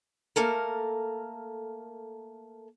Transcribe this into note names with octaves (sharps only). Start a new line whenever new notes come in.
A3 A#3 A4 A#4